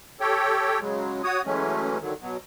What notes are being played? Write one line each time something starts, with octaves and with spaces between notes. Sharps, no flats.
G4 A4 C#5 G5
C#3 F#3 G#3
F#4 C#5 D#6
E3 F#3 G#3 A3 C#4
D3 D#3 F#3
B2 F#3